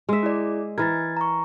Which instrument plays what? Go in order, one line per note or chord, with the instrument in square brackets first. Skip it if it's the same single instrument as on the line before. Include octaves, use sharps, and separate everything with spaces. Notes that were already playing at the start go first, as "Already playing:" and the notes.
[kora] G#3 E5
[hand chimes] E4 G#4 D5
[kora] E3 A#4 [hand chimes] G#6 A6
[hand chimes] A#5 C#6